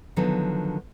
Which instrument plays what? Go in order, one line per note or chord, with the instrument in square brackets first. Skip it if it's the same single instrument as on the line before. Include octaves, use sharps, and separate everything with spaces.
[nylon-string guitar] D3 D#3 F3 F#3 B3